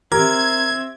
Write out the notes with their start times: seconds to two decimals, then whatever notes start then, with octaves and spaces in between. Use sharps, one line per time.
0.12 C4 G4 A#4 E5 G#6